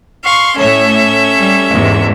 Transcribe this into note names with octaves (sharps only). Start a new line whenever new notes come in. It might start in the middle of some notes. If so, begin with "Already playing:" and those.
F5 C6 C#6
A2 C#4 A4 C#5 E5
G3
E2 G#2 C3